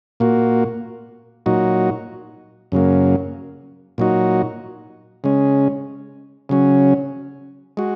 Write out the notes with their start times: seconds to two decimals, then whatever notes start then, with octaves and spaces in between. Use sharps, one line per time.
0.20 A#2 A#3 F#4
1.46 A#2 F#3 D#4 F#4
2.72 F#2 C#3 F#3 A#3
3.98 A#2 F#3 D#4 F#4
5.24 C#3 G#3 C#4
6.49 C#3 F#3 C#4
7.77 G#3 F#4